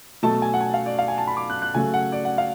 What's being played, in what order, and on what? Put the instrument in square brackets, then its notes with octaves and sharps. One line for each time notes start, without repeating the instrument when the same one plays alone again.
[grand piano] B2 F#3 A3 A5
G#5
F#5
G#5
F5
D5
F5
G#5
A5
B5
D6
F#6
F#6
C#3 F#3 A3 G#5
F#5
D5
F#5
F5